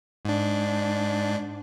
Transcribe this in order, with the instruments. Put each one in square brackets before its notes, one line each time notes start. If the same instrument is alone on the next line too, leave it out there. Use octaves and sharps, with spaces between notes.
[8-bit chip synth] G#2 D4